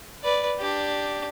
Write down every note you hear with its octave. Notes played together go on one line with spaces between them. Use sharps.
B4 D5
D4 G4